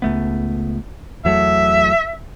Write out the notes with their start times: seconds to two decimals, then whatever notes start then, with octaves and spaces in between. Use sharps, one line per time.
0.02 C#2 A3 B3
1.25 E2 F#3 A3 E5